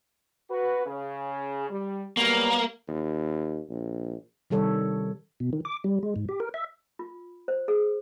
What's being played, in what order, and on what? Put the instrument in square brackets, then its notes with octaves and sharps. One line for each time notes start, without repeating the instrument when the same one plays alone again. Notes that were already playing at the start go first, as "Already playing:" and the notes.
[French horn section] F#4 B4
C#3
G3
[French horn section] F#3 G3 B3 [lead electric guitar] A#3
[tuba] D#2
A#1
[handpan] C3 D#3 G3 A4 C#5
[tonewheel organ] B2
D#3
D6
G3
G#3
G#2
G4
A#4
E5
[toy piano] F4
C5
G#4